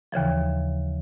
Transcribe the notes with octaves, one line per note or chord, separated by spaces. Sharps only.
D#2 C#3 E3 F3